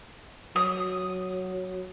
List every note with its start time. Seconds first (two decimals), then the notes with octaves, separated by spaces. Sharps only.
0.56 F#3 D#6